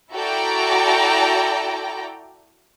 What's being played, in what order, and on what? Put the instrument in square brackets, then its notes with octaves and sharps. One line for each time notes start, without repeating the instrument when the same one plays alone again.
[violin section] E4 F#4 A4 D5 G5 A#5